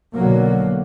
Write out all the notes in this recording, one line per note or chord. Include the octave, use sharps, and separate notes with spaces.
B1 D3 F#3 A#3